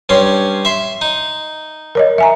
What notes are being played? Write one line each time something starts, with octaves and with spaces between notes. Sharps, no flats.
G2 C#4 C6
E5 C6
D#4
A#4 C#5 D#5
E5 G#5 A#5